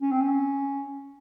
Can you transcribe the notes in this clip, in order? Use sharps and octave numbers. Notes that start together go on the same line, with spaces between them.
C#4
C4
C#4